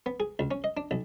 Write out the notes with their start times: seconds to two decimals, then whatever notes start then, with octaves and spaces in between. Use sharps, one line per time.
0.06 B3
0.20 G#4
0.39 C#2
0.51 C#4
0.64 D#5
0.77 D4
0.91 B1